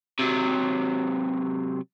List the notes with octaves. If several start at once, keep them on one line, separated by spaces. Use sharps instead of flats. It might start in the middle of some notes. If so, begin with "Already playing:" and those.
C3 F#3